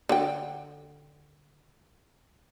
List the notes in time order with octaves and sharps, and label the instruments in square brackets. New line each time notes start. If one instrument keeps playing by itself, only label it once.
[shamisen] D3 F#4 G5